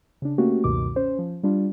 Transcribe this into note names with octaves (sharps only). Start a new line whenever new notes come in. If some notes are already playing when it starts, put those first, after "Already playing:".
C#3 D4
A3 A#3 C#4 F#4 G4
C#2 F#2 B2 D#3 D6
C#4 C5
F3
G3 D4 F4